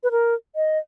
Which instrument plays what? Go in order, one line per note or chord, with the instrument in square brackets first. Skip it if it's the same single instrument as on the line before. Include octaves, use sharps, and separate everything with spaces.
[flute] B4
A#4
D#5